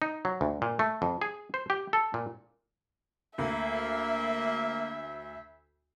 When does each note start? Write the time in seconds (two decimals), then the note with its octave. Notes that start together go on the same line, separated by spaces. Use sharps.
0.02 D#4
0.25 F#3
0.41 D2
0.62 A#2
0.79 A3
1.02 F2
1.22 G#4
1.54 C5
1.70 G4
1.93 A4
2.14 A#2
3.38 D2 A#3 E5